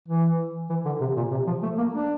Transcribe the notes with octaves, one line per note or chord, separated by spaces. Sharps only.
E3
E3
D3
C3
A#2
C3
F3
A3
A#3
D4